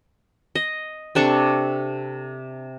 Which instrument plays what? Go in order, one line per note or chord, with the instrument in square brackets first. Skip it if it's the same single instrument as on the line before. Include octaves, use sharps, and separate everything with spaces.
[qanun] D#5
C3 D4 A4 C#6